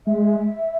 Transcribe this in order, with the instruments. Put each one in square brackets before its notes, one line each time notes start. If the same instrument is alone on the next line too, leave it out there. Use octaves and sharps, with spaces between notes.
[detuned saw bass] G#3 [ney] E5